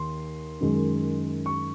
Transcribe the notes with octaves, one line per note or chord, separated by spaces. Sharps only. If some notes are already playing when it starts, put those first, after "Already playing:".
Already playing: D#2 C6
F#2 D#3 G#3
C#6